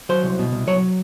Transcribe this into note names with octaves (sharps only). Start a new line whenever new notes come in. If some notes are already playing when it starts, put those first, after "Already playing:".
F#3 C5
C2
B2
C2
F#3 C#5